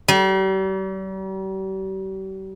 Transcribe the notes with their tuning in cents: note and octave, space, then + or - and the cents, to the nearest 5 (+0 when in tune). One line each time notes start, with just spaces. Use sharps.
G3 -40